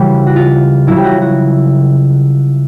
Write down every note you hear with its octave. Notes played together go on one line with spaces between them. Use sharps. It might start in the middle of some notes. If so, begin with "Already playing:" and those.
Already playing: C#3 E3 G3 F#4
F#4
F4
C#3 F#3 E4
G4
F#4
F#4